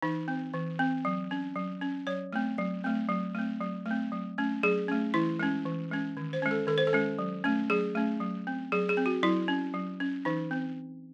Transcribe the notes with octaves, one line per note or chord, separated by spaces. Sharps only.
E3 D#4
C4
E3
C4
F#3
C#4
F#3
C#4
F#3 C#5
A3 C4
F#3
A3 C4
F#3
A3 C4
F#3
A3
C4
F#3
A3 C#4
F#3 G#4
A3 C#4
E3 E4
G#3 C#4
E3
G#3 C#4
D#3
C5
G#3 C#4
A4
D#3 A4
C5
A4
G#3 C#4
F#3
A3 C#4
F#3 G#4
A3 C#4
F#3
C4
F#3 G#4
G#4
C4
F#4
F#3 E4
C#4
F#3
C#4
E3 D#4
C4